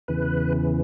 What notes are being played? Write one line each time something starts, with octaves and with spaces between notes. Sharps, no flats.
E2 C#3 E3 B4